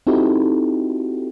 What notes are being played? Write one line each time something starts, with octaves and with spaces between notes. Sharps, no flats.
C4 D#4 E4 F#4 G4 A4